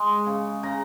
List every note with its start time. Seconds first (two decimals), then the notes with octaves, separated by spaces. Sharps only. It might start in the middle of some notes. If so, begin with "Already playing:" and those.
Already playing: G#3 C6
0.27 C#3
0.63 C#3 A#5